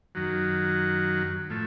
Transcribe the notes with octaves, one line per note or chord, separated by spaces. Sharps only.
F#2 D#3 F#3
A2 F3 A3